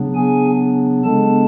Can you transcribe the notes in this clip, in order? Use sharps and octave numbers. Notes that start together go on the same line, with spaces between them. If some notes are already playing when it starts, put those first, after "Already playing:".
Already playing: C#3 F#3 B3 D4
G#4 G#5
C#3 G#3 B3 D4 A4 A5